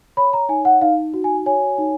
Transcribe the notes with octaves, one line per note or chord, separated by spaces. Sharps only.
C#5 B5
A#5
D#4 G#5
F#5
D#4 F5
F#4
G#5
C#5 G#5
D#4